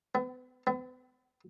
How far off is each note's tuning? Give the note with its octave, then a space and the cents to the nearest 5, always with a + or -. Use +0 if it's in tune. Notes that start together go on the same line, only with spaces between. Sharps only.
B3 +35
B3 +40